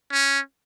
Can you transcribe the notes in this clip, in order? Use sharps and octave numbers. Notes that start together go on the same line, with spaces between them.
C#4